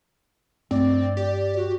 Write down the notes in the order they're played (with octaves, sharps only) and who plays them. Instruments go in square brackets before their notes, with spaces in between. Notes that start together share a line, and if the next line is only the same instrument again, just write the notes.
[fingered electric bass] G2 A3 D4 [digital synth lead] C4 [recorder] D5
[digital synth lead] G4
[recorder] F#4